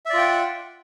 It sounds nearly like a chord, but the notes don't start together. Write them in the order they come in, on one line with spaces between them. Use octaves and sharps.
E5 D5 F4 G5 F#5